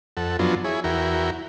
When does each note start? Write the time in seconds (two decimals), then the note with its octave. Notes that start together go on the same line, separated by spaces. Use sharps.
0.17 F2 A4 F#5
0.39 F#2 F3 F#3 B3 D4 F4
0.64 E4 G#4 C#5
0.84 E2 E4 F#4 A#4 G5